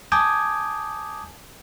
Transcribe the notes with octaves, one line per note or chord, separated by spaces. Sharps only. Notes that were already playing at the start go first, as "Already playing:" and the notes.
G#5 A5 D6 D#6 G6 G#6